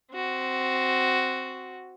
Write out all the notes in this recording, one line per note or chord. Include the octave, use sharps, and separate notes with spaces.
C4 F#4